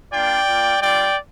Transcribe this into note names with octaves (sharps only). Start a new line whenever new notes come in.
A#3 D4 F4 D5 G5
A#3 F4
G3 D4 F4 D5 G5